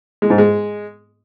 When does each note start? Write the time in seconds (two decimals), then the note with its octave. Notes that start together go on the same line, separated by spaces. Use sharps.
0.22 G#3
0.30 G#2
0.38 G#3